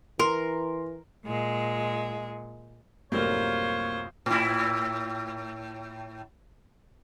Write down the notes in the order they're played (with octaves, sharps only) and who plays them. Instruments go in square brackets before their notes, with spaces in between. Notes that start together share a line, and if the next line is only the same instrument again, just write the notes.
[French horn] E3 [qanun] A#4 [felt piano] C6
[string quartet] A#2 G#3
[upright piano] C2 F#2 A2 [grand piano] A#3 [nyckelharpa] F4 C5 [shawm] C#5
[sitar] A2 E4